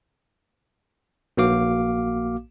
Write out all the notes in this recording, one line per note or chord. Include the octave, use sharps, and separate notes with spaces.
A#1 A#3 F#4 F5 D6